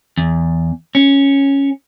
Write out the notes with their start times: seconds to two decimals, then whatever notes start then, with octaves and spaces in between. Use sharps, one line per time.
0.17 E2
0.95 C#4